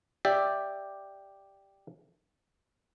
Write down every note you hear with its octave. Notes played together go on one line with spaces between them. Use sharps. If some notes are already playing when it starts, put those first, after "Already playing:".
G4 D5 E5